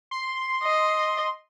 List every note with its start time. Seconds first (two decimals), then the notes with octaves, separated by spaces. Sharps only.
0.11 C6
0.63 D#5